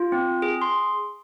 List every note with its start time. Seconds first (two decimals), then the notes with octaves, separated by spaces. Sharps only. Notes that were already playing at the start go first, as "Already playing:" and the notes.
Already playing: F4
0.12 C4
0.42 G#4
0.62 C6